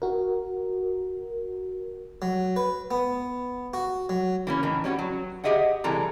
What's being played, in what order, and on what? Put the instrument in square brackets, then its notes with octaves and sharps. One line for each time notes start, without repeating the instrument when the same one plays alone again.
[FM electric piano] F#4 A#4
[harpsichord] F#3
B4
B3
F#4
F#3
[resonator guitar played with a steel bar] E3 A#3 C#4
A2 D#3 E3
G3 C#4 F4 F#4
F#3
G4 G#4 D#5 E5 F#5
C3 E3 G3 G#3 A4 A#5